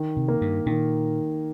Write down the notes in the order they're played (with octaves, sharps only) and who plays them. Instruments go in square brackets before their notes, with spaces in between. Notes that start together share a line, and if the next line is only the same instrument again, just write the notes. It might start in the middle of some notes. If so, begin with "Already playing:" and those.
Already playing: [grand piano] D#3
[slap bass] C3
[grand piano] A#3
[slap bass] G2
[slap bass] A#2 [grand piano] D#3